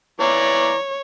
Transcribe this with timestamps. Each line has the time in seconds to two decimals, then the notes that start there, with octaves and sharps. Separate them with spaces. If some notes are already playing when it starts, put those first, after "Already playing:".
0.20 E3 C#5 D5 A#5